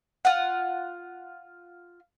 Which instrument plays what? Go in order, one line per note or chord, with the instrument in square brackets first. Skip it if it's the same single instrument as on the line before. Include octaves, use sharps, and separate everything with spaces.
[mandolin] F4 F#5